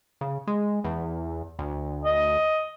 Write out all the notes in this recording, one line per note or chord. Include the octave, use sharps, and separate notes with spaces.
C#3
G#3
E2
D2
D#5